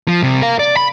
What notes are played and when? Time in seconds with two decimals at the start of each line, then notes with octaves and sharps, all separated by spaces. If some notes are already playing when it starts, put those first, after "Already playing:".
0.08 F3
0.23 C2 C3
0.42 A#4 F5
0.59 D5
0.77 B5